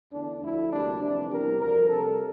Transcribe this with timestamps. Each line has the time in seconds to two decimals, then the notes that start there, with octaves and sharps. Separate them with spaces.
0.12 E2 D3 A3 D4
0.42 D2 D3 F3 A3 E4
0.71 D2 C3 G3 A#3 D4
1.01 F2 C3 E3 D4
1.30 E2 C3 E3 G3 A#4
1.60 D2 D3 F3 A#4
1.89 C2 C3 G3 A4